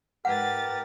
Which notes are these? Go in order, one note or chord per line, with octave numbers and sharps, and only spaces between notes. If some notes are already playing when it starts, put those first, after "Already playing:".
G#2 G4 A#4 B4 F#5 A6